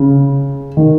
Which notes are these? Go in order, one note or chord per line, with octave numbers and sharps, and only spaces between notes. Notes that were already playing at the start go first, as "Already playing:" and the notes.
Already playing: C#3
D#3